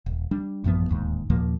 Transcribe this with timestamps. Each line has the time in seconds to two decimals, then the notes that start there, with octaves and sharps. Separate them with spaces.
0.06 D#1
0.31 G3 D4
0.64 A1 F#2 F3 B3
0.89 D1 D#2 G#2
1.30 D#2 A#2 F3 A#3